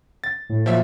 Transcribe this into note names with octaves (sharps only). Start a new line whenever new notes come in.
A6
A2
A#2 F3 F#3 E5